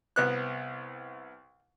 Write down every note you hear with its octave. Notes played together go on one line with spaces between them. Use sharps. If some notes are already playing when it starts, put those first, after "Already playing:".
C2 B3 F#6